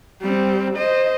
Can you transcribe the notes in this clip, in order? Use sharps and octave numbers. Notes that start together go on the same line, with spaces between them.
G3 C4
C5 D#5